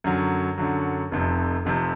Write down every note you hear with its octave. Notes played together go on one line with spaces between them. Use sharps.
F#2 D3 F#3
F#2 D3 F#3
F1 F2 C3
F1 F2 C3